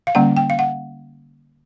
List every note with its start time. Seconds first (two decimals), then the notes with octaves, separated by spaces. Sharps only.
0.07 F5
0.15 D3 G3 A#3 C#4 F#5
0.37 G5
0.50 F5
0.59 F#5